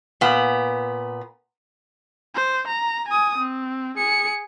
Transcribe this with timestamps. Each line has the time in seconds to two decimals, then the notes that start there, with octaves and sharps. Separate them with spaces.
0.21 A#2 B3
2.34 C5
2.68 A#5
3.08 G#5 D#6
3.38 C4
3.97 G#4 C#7